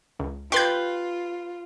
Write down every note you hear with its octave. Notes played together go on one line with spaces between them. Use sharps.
C#2
F4 G4 B4 C6 G6